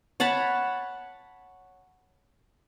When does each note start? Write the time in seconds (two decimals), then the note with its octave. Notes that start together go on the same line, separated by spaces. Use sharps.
0.20 C#5 F#5 A5 B5